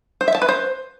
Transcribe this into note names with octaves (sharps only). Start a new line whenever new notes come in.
C5
E5
A5
B4
C5